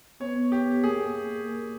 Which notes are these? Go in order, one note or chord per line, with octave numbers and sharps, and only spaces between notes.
B3 C#5
G4
A#3 G#4